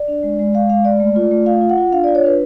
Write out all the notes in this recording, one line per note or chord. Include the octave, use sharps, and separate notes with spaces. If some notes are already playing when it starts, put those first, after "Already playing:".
Already playing: D5
D4
G#3
G#3
G#3 F5
G#3 F5
G#3 D5
A3
F4
A3
F4 F5
F4
F#5
F4
D4 F5
F4 D5
C#5
D4 B4